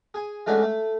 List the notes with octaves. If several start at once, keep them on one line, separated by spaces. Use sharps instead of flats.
G#4 G#5
E3 G#3 A3 C#4 D4 F#4
A3